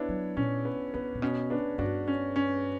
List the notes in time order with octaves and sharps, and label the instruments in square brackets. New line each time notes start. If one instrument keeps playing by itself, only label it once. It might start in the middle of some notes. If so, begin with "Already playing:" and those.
Already playing: [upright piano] B3 D4 E4 C#5
[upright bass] F#3
[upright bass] A#2 [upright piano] C#4
[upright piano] B3
[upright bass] E2 [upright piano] B3
[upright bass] A#2
[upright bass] B2 [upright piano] C#4
[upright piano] B3 D4
[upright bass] G2 [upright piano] D4 F#4
[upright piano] C#4
C#4